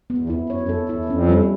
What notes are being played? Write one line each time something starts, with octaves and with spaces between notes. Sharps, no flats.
B3
E2
F2 E4
F#2 C#5
F#2
F2 A4
E2 E4
E2
F2 C#4
G3